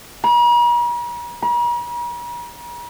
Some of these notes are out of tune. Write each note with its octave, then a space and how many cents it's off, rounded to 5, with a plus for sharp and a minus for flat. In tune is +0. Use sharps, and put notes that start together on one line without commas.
A#5 +45
A#5 +45